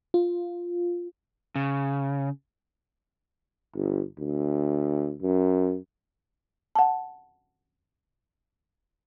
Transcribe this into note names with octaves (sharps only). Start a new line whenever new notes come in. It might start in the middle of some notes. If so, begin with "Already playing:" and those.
F4
C#3
G1
D2
F#2
F#5 A5